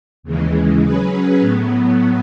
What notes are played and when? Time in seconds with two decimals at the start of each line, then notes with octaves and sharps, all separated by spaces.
0.23 D#2 C#3 E3 G#3
0.82 F#3 C#4 G#4 B4
1.40 A2 F#3 B3